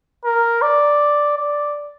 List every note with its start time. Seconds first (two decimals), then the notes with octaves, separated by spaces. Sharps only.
0.25 A#4
0.62 D5
1.37 D5